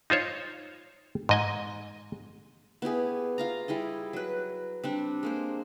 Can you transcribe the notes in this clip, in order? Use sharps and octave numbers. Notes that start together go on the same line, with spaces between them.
D#4 F4 C5 C#5
G#2 D#5 G#5
B3 E4 G4 G#4
F4 F5 A#5
G3 E4 G#4 D#5
F#3 B4
G3 C4 D4
G#3 A#3 C5